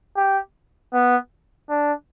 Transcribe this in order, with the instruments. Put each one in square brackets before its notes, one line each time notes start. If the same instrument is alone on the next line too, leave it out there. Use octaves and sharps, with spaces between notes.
[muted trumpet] G4
B3
D4